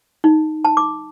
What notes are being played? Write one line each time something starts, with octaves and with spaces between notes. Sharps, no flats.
D#4
A5
D6